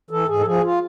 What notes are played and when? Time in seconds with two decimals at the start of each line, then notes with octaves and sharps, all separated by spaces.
0.10 E3 A4
0.28 G#2 G#4
0.39 A4
0.46 F3 G#4
0.63 F4